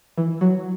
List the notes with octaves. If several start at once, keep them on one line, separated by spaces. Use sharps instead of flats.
E3
F#3